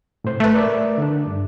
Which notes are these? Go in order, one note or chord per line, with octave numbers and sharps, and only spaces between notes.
A2 C3 C5
A3 B4 A5
A#4 D5 E5
D3 D4
G2